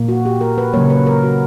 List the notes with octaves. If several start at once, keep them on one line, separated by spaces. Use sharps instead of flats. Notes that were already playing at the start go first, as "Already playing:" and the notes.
Already playing: A#2 A#3
F#4
G4
A#4
B4
C#3 F#3 A#3 C#5
B4
A#4
F#4